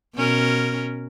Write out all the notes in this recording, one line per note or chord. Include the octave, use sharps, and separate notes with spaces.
B2 C#4 A#4